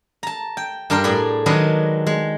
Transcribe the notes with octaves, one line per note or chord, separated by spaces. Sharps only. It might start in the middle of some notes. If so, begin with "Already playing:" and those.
A5 A#5
G5
G2 D4 A#4 G5 C6
A2 G#4 D5 B5
D#3 F#3 G#3 D4 B4 D#5
G#3